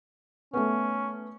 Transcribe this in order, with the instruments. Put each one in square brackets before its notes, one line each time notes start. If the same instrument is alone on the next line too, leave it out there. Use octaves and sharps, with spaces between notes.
[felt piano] A3 B3 [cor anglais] C#4